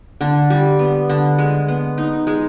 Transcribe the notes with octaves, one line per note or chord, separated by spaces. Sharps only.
D3
G3
B3
D3
G#3
B3
D#4
G#3